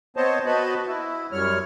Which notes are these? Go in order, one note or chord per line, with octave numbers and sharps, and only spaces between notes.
B3 C4 C5 C#5 D#5 A5
B3 F#4 B4 D#5 A5 B5
E4
F#2 G3 C#5 F6